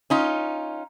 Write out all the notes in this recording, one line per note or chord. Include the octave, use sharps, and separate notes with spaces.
C#4 D#4 F4